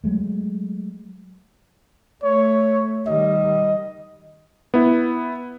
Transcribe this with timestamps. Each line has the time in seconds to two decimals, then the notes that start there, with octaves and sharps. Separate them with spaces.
0.04 F#3 G#3 A3
2.23 A3 C#5
3.07 D#3 G3 D#5
4.74 B3 E4